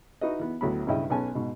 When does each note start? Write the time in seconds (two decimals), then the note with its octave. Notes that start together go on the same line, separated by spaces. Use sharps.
0.21 D#4 E4 F#4 B4 D#5
0.39 E3 B3
0.61 D2 A2 F#3 B3 B5
0.86 B1 G2 C#3 E4 D#5 G5
1.10 B1 B3 C#4 G#5 A5
1.35 G#2 B2